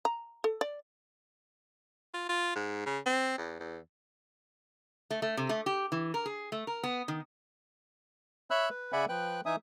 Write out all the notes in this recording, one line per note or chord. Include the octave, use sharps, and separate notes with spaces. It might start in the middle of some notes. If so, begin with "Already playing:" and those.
A#5
A4
D5
F4
F4
G#2
C#3
C4
E2
E2
A3
A3
C3
A3
G4
E3
A#4
G#4
A3
A#4
B3
D#3
C#5 E5 B5 E6 F#6
B4
C#3 D5 E5 F#5 G#5 B5
F3 B4 G5 F#6
E3 D#4 E5 G#5 D#6